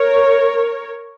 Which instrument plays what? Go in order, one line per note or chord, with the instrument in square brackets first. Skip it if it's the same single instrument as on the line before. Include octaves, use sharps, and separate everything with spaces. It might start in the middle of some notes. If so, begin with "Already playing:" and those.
Already playing: [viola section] A#4 C#5